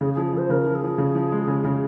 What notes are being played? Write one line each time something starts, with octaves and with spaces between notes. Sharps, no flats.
C#3 G#4
G#4
F3
G#4
F3 C5
C#3 A#4
F3
G#4
F3
C#3
F3
G#3
C#3
C#3